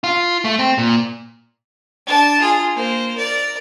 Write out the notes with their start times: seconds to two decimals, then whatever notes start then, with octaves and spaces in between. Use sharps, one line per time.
0.04 F4
0.45 A3
0.59 C4
0.78 A#2
2.07 D4 A5
2.41 F4 G#4
2.75 A#3 C5
3.17 A#4 D5